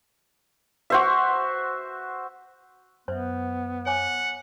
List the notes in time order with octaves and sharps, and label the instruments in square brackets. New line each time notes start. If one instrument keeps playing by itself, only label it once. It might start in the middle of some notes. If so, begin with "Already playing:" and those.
[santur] F#4 C5 E5
[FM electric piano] F#2 [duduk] B3 [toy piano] C5 E5
[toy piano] C#5 G#5 D6 [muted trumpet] F#5